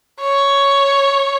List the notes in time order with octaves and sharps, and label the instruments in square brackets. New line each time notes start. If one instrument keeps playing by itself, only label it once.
[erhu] C#5